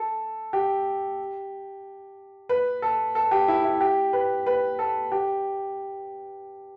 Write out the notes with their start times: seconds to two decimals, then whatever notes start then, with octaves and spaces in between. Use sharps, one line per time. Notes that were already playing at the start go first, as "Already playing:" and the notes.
Already playing: A4
0.53 G4
2.49 B4
2.82 A4
3.15 A4
3.31 G4
3.48 E4
3.65 E4
3.81 G4
4.13 B4
4.47 B4
4.79 A4
5.12 G4